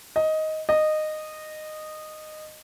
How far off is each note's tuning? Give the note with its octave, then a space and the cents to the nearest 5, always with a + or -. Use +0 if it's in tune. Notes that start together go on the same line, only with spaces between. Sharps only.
D#5 +10
D#5 -15